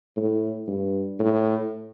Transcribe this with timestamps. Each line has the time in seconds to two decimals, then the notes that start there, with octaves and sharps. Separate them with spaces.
0.17 A2
0.68 G2
1.19 A2